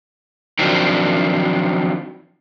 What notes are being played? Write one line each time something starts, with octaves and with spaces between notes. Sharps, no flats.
D#3 F3 F#3 C4 D4